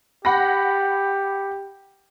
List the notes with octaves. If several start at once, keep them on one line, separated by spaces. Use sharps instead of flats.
G4 F#5 B5 A#6